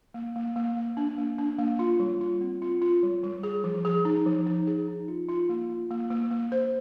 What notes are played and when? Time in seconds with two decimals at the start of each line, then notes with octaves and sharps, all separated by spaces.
0.14 A#3
0.36 A#3
0.56 A#3
0.77 A#3
0.97 D4
1.18 A#3
1.38 D4
1.59 A#3
1.79 F4
2.00 G3
2.21 F4
2.41 C4
2.62 F4
2.82 F4
3.03 G3
3.23 G3
3.43 G#4
3.64 F3
3.85 G#4
4.05 D#4
4.26 F3
4.47 D#4
4.67 G#4
4.88 D#4
5.08 F4
5.29 F4
5.49 A#3
5.70 F4
5.91 A#3
6.10 A#3
6.31 A#3
6.52 C5